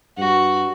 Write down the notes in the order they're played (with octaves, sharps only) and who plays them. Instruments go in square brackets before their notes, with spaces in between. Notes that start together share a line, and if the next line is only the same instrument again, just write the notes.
[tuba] G2 [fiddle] F#4